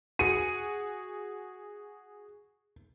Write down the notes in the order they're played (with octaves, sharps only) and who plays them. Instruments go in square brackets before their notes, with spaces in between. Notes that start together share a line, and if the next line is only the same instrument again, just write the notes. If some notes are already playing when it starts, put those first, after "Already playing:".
[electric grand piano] F#4 G#4 C#7 [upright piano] D#7